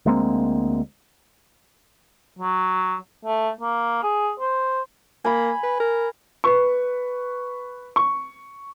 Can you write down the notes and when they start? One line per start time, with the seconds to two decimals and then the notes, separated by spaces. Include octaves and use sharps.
0.06 D2 G#3 A#3 C4
2.38 F#3
3.25 A3
3.61 A#3
4.03 G#4
4.40 C5
5.25 A#3 G#5 B5
5.63 B4
5.80 A#4
6.44 B4 C#6
7.96 C#6